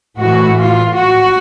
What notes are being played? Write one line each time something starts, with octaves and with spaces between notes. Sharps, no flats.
A2 E3 F#4
F4
F#4